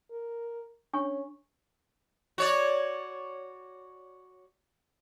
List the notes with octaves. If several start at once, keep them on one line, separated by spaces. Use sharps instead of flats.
A#4
C#4 D4 G#5 C#6
F#4 C#5 D5